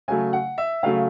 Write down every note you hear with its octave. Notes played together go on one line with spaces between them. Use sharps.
C#3 F#3 A3 G#5
F#5
E5
C#3 F#3 A3 F5